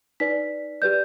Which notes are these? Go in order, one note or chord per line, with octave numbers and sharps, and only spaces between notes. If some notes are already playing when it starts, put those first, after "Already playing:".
D#4 B4 D5 B6
G4 B4 D5 G6